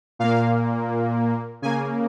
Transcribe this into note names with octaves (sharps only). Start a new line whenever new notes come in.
A#2 A#3 F5
C#3 A#3 G#5